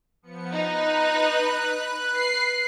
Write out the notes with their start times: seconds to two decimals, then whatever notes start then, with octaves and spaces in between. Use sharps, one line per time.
0.22 F3 B3 C#7
0.52 D#4 B4 F#6
2.15 C7